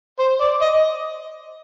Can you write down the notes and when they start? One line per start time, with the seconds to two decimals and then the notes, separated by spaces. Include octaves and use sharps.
0.19 C5
0.40 D5
0.61 D#5